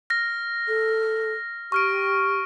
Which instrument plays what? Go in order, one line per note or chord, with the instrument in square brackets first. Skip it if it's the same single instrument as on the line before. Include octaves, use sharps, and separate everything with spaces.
[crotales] F6 A#6
[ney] A4
[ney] G4 [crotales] C#6 F6 D7